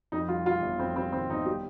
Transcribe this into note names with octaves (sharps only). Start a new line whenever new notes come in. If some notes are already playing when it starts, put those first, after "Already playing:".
F2 D#4
G3 F4
G3 F4
G1
F2 C4
G3 C4
D#3 C4
G1 D#4
G3 G4